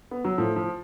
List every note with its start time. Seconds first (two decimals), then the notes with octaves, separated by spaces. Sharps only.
0.11 B3
0.24 F#3
0.38 A2 F3
0.56 F3